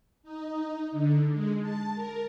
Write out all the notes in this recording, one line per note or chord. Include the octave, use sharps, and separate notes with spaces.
D#4
D3
G#3
A5
A#4